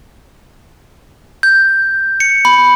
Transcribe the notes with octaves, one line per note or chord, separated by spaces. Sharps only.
G6
C#7
B5